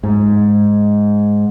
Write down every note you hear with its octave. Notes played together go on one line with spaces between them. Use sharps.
G#2